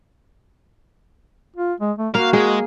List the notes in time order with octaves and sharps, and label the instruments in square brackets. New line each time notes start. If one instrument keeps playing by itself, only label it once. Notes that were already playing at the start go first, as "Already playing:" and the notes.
[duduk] F4
G#3
A3
[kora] A#3 [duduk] F#4 [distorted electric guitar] F5
[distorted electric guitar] G#3 [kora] G#4